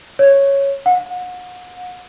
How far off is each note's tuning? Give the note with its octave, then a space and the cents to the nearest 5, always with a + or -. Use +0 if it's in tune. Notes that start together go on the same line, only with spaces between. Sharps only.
C#5 -5
F#5 -35